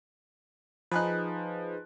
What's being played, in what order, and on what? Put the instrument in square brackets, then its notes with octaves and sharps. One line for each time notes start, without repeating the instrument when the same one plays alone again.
[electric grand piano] F3 F#6 [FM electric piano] D#4 G#4 B4